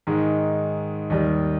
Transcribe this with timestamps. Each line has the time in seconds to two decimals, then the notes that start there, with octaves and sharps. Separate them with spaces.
0.07 G#2 D#3 G#3
1.10 D#2 D#3 G3